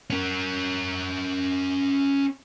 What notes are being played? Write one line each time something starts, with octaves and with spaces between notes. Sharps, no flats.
C#4 A#4